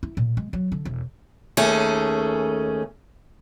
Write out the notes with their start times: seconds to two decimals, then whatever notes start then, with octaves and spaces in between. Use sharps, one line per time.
0.03 E4
0.17 A#2
0.37 G#3
0.53 F#3
0.72 D3
0.85 E1
1.57 D#2 A3 C#4 G#4